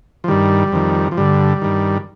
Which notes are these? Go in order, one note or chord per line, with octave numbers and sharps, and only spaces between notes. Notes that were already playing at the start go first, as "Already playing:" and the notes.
F3
G2 D#3 G3
F2 D#3
F3
G2 D3 G3
G2 D#3